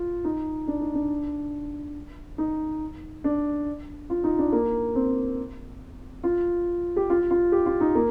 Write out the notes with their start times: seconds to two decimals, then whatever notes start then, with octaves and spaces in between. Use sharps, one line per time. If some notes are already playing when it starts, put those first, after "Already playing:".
Already playing: F4
0.24 D#4
0.67 D4
0.81 D#4
0.95 D4
2.38 D#4
3.24 D4
4.10 F4
4.24 D#4
4.38 D4
4.52 A#3
4.95 C4
6.23 F4
6.96 G4
7.10 F4
7.30 F4
7.52 G4
7.66 F4
7.81 D#4
7.95 A#3